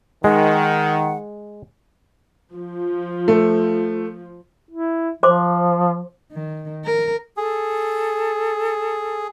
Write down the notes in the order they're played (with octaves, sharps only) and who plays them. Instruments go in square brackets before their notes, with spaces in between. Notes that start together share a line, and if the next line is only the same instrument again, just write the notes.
[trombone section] D#3 [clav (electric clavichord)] G#3 [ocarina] F#5
[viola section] F3
[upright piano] A3
[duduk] E4
[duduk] F3 [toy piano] C5 C6 D6
[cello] D#3
A#4
[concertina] G#4 [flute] A4